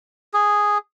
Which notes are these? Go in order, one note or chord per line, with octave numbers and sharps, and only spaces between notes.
G#4